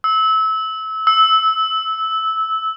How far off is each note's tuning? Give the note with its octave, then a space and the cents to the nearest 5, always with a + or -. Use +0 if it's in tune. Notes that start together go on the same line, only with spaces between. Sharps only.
E6 -25
E6 -15